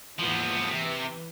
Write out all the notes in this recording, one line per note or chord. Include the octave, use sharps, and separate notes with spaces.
D#2 G#2 E3 F3 B3
C3 E3